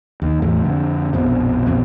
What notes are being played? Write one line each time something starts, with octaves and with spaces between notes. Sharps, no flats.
D#2
E2 A2
F2 D3
A#1 F2 B2
A#1 F2 B2